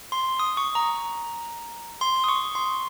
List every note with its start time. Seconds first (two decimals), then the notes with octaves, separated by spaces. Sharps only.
0.12 C6
0.39 D#6
0.57 C#6
0.75 A#5
2.01 C6
2.24 D#6
2.29 C#6
2.55 C6